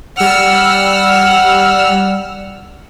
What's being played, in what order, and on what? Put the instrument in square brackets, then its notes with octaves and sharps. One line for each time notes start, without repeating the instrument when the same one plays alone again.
[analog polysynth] G3 E6 F6 [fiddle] F#5